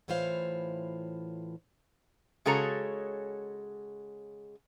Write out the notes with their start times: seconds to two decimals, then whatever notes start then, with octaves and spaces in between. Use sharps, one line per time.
0.08 A2 E3 F4 C5 C#5 F5
2.45 C#3 G#3 F#4 A4 C#5 A#5